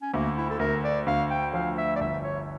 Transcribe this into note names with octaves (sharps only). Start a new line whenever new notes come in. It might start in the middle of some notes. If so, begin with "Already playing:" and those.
C#4
D2 A#3
E4
A4
D2 A#4
D5
D2 F5
G5
F3 F5
E5
D5
G1 E5
C#5